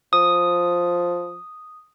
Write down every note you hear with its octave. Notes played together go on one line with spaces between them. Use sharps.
F3 D#6